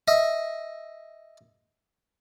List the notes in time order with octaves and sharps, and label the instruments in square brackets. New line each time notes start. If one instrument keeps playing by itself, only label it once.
[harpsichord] D#5 E5